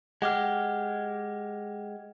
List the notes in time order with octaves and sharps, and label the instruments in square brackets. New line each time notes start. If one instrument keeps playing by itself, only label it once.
[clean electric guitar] G#3 G4 [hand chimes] F#5 F6